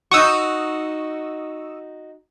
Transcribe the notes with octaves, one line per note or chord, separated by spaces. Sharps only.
D#4 F#4 C#6 D#6 E6